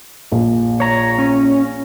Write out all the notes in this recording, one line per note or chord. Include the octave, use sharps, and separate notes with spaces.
A#1
C#5 A#5
C#4